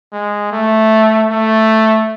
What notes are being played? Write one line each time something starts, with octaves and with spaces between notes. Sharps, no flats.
G#3
A3
A3